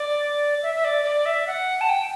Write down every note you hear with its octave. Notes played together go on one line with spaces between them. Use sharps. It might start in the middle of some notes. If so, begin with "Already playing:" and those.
Already playing: D5
E5
E5
D5
D5
E5
F#5
A5
G5